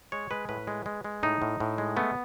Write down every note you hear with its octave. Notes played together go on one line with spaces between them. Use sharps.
G#3 C#5
G#3 B4
A2 B4
G#3
G#3
G#3
A2 D#4
A2
A2
G#3
A3 B3